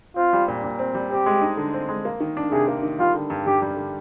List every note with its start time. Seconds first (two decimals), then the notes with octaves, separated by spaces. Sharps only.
0.16 C4 F4
0.33 G3
0.48 A#2
0.64 A#2
0.79 C4
0.95 G3
1.11 C4 G4
1.26 G#3
1.42 D#4
1.57 D3
1.74 C4
1.89 G#3
2.05 A#3
2.20 D#3
2.37 D4
2.52 C3 G#4
2.68 A#3
2.83 D#3
2.99 G3 F4
3.14 D3
3.30 G2
3.46 G2 G4
3.62 G3
3.76 D3